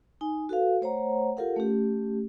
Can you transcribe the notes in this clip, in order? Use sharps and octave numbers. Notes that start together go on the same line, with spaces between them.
D#4 G#5
F#4 A4 B4 F5
A3 C5 C#5 F#5 A#5
F4 G4 A4 A#4 F5 F#5
A3 C#4 G4